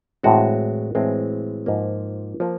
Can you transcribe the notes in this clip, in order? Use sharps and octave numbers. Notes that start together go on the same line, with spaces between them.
A2 E3 G#3 C4 F#4
A2 E3 G#3 C4
G#2 F3 A#3
F3 A#3